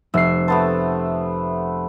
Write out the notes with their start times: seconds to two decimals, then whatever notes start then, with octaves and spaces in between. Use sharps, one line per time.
0.14 F1 E5 C7
0.48 A3 B3 C5 A5